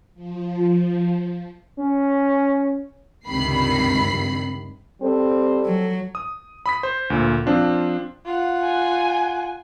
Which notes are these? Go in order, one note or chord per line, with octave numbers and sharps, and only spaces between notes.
F3
C#4
C#2 G2 C3 D#3 B5 C7
G3 C4 A4
F#3
D#6
B5 D#6 B6
C5
D2 A#2
F3 C4 D4 F4
F4 F#5
G#5